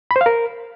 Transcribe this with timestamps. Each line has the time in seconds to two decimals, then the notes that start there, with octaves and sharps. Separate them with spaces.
0.11 B5
0.16 C5
0.21 F5
0.26 A#4